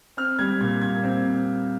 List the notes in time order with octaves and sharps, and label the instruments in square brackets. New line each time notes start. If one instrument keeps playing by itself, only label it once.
[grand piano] C4 F6
G3 G#6
A#2 G#6
A#2 G#6
C4